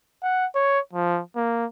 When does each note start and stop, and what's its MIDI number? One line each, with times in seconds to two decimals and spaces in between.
0.23 0.46 78
0.55 0.80 73
0.93 1.21 53
1.36 1.66 58